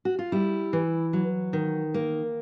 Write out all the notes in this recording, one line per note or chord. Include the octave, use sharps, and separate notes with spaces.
F#4
F4
G3 E4
E3
F#3
D#3
A#3